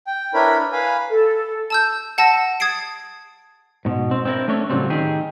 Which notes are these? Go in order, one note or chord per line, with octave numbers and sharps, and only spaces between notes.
G5
D4 E4 A#4 B4 C#5 B5
B4 F5 G#5 B5
A4
A5 E6 G6
F#5 A5 E6 A#6
D#6 G#6 A6 C7 D7
G#2 B2
C4
C4 D4 E4 G#4 A#4
A3 C#4 D4 C#5
A2 C#3 E3 F#3 G3 C4
D#3 G4 G#4